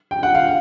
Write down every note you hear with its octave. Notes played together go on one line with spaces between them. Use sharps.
G5
F#5
F5